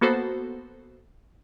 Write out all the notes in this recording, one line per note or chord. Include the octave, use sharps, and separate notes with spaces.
A#3 B3 F#4 A4 C5